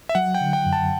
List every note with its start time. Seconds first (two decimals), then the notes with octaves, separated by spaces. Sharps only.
0.09 E5
0.15 F#3 F#5
0.35 G5
0.41 D3
0.53 G5
0.66 F#2
0.73 A5